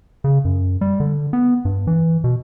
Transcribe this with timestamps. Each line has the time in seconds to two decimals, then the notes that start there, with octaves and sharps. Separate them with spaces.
0.24 C#3
0.45 F#2
0.81 G3
1.00 D3
1.33 B3
1.65 G2
1.87 E3
2.24 B2